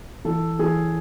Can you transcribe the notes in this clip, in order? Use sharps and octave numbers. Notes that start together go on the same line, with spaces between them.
E3 A4
E3 G#4